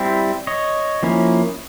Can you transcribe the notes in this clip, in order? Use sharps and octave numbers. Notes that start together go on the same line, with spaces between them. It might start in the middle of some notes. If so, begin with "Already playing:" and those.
Already playing: G3 C4 E4
C#5 D#5
F3 A#3 C#4 E4